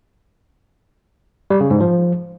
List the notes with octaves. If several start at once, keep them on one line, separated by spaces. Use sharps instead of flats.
G3
C#3
G#2
F3